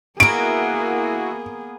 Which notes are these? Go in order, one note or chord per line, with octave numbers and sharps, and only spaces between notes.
A#3 B3 E4 F#4 G#4 A#4 D7